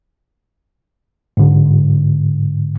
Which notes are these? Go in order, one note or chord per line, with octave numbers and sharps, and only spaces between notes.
G#2 D3